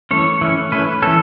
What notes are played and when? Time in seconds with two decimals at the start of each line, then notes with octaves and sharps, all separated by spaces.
0.11 E3 A3 C#4 C#5
0.41 E3 A3 C#4
0.72 E3 A3 C#4 B4
1.02 E3 A3 C#4 A4